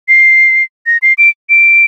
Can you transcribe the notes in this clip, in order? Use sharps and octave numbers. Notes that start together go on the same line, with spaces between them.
C7
A#6
C7
D7
D7